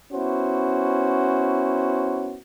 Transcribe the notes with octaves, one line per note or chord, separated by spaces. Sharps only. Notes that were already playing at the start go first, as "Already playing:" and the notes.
B3 C#4 E4 F#4 C5